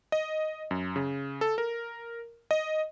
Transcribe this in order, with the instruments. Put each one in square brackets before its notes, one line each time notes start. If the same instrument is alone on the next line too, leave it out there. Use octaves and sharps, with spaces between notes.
[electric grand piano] D#5
F#2
C#3
A4
A#4
D#5